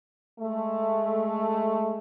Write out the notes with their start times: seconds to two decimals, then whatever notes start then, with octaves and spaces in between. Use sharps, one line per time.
0.40 G#3 A3